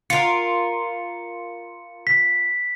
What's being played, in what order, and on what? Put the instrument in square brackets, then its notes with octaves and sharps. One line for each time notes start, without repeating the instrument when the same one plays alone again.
[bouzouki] F4 A#4 [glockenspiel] C#7
[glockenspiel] B6